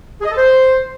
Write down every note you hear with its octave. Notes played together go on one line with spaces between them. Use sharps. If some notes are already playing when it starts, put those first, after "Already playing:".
G#4
D#5
A4
C5